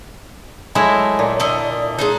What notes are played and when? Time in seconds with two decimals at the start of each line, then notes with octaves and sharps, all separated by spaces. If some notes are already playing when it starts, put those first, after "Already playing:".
0.75 F#3 G#3 A3 E4
1.19 A#2
1.40 D3 E4 D#5
1.99 G#3 D4 D#4